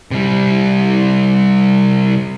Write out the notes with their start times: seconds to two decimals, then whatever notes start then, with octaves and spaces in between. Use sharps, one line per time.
0.11 C3 G3